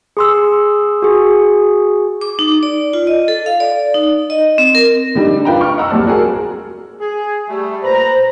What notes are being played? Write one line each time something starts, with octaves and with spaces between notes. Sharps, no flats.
G#4 C6 E6
F#4 G#4
D6
D#4
D5
F4
D#5
A4
F5
D5
D#4
D#5
C4
A#4
D3 G3 D4 D#4
D4 F4 B4 G5 A#5
C#6 F6
D#5 F#5 A#5 E6
F#1 D#2 G3 C4 D5 A5
F#4 G#4 A#4
G#4
G3 A3
A#2 B4 C5 A#5